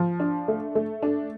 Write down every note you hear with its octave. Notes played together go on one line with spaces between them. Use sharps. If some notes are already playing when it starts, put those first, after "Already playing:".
Already playing: F3
D4
A3
A3
D4